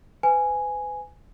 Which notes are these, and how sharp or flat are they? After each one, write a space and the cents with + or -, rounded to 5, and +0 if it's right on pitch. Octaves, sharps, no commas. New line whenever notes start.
B4 +35 G#5 +0